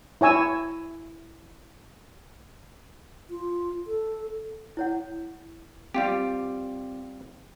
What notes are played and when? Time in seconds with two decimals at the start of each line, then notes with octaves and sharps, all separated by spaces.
0.21 E4 C#5 G#5 E6
3.30 F4
3.87 A4
4.77 E4 C#5 F#5
5.94 G3 C4 F4 G4